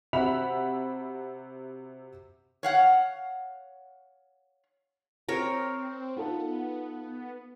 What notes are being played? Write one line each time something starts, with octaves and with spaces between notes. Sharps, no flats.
C3 F#4 E5 F#5 B5 F7
C#5 F5 F#5
C4 A#4 C#5
B3 D#4 F4 A4